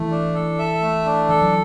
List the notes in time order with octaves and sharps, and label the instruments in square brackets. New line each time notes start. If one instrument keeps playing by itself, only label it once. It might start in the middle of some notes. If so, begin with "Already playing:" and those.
Already playing: [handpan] E3 [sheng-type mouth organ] A3
[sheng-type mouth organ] D4
A4
E5
A3
D4
[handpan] E3 [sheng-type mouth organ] A4
[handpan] F#3